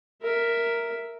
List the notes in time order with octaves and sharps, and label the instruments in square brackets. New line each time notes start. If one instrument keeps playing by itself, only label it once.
[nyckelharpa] A#4 E5